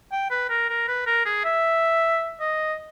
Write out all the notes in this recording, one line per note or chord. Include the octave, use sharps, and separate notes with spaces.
G5
B4
A#4
A#4
B4
A#4
G#4
E5
D#5